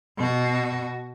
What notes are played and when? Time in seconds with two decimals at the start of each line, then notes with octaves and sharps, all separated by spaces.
0.18 B2 F#4